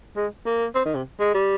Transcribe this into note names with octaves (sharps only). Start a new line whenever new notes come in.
G#3
A#3
C4
D#3
C3
G#3
G3